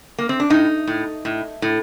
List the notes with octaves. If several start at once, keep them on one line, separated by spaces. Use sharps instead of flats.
A#3
C4
D4
A2 D#4
A2
A2
A2